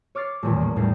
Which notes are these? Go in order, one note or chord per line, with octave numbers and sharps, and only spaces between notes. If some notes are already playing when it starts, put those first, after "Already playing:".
C#5 D6 F6 A6 C7
D#1 A1 E2 A#2
A#3
F#1 E2 A2 G3 D#4 C7